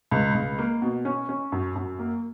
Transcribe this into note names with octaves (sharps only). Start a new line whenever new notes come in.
C#2
C#2
A#3
B2
C#4
C#4
F#2
F#2
A#3